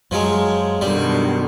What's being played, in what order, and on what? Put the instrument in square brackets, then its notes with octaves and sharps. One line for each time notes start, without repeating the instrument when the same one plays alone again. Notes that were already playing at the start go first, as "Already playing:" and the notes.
[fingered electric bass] F#2 [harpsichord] F3 F#3 G#3
[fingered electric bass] F#2 [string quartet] B2 D3 D#3 [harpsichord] G3